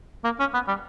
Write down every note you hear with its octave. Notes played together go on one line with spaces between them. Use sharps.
A#3
C#4
B3
G3